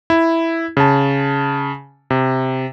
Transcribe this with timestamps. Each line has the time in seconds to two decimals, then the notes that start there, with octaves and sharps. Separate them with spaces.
0.10 E4
0.77 C#3 A5
2.10 C3